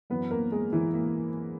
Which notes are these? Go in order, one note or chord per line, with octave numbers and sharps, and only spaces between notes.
F#2 E3 B3 B4
A#3 A#4
G#3 G#4
E3 E4
A#3